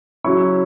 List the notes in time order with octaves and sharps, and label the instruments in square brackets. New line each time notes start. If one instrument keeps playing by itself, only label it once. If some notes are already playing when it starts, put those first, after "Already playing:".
[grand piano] C#3 F#3 C#4 E4 C#6